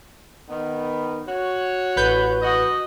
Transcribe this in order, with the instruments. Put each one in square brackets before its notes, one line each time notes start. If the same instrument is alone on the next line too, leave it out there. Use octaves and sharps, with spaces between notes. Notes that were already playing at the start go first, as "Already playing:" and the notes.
[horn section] D#3 B3
F#4 C#5
[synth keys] A1 B4 G6
[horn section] F#4 D#5